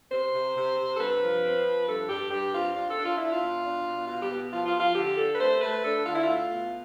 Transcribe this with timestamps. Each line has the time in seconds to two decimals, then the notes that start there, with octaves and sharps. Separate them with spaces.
0.11 C3 C5
0.34 C3
0.55 C3
0.77 C3
0.95 A4
0.99 G2 B4
1.21 F3
1.43 C4
1.65 F3
1.87 G2 A4
2.09 G2 G4
2.31 G2 G4
2.53 C4 F4
2.75 D4 F4
2.90 A4
2.97 D4
3.04 F4
3.17 D4 E4
3.31 F4
3.41 B2
3.64 D4
3.85 B2
4.07 B2 F4
4.22 G4
4.29 B3
4.52 F3 F4
4.66 F4
4.74 F3
4.80 F4
4.95 D3 G4
5.17 D4 A4
5.34 B4
5.40 A3 C5
5.61 A3 B4
5.83 D4 A4
6.05 D3 F4
6.15 E4
6.24 A3 F4
6.49 B2